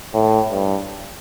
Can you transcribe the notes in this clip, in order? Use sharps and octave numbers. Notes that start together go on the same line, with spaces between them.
A2
G2